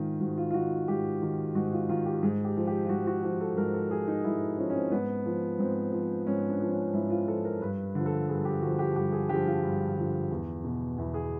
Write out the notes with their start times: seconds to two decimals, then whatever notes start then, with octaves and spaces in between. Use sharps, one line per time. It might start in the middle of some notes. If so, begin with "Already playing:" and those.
Already playing: G#2 D#3 F4
0.20 G#2 F#4
0.38 F4
0.50 F4
0.54 D#3 F#4
0.88 G#2 G4
1.22 D#3
1.55 G#2 F#4
1.73 F4
1.89 D#3 F4
2.06 G4
2.23 G#2 G#4
2.45 G4
2.57 F3
2.67 G4
2.84 F4
2.89 G#2 F#4
3.07 F#4
3.23 F3 G4
3.41 A4
3.57 G#2 A#4
3.74 A4
3.91 F3 G#4
4.08 D#4
4.24 G#2 E4
4.58 F3 C#4
4.70 C#4
4.75 C4
4.92 G#2 B3
5.26 F3
5.59 G#2 C4
5.93 F3
6.27 G#2 C#4
6.49 D4
6.61 F3
6.72 C#4
6.93 G#2 E4
7.10 F4
7.27 F3 A4
7.45 A#4
7.61 G2 B4
7.95 D3 F3
8.06 A4
8.29 G2 G#4
8.45 G4
8.62 D3 F#4
8.66 F3
8.79 G4
8.95 G2 G4
9.12 G#4
9.29 D3 F3 G4
9.46 F4
9.63 G2
9.97 D3 F3
10.31 E2
10.64 B2
10.97 E2 E4
11.14 G#4